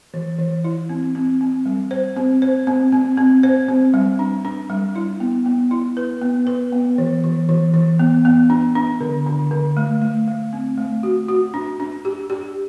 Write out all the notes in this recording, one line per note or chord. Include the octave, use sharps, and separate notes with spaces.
E3
E3
E4
C4
C4
C4
G3
C5
C4
C5
C4
C4
C4
C5
C4
G3
D4
D4
G3
E4
B3
B3
E4
B4
B3
B4
B3
E3
E3
E3
E3
B3
B3
D4
D4
D3
D3
D3
A3
A3
A3
C4
A3
F#4
F#4
D4
D4
G4
G4